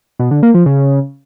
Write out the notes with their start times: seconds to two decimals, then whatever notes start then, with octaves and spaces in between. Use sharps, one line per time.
0.19 B2
0.31 D3
0.43 A#3
0.54 F3
0.66 C#3